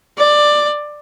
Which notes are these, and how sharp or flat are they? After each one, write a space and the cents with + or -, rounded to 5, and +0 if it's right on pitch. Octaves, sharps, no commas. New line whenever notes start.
D5 +15